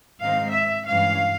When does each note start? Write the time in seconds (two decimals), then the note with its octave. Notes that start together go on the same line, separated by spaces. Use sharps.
0.20 G#2 D#3 G#3 C4 D#4 F5
0.54 E5
0.87 G2 E3 G#3 C#4 F5